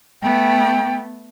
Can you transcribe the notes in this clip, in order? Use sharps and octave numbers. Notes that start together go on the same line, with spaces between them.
A3 B3 G5